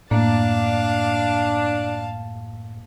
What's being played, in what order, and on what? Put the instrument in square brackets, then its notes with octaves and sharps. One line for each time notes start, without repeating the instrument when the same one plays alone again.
[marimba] F#2 A#3 [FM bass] A2 [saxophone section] D4 [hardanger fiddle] F5 A5